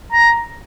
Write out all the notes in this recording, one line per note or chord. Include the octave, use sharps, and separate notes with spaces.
A#5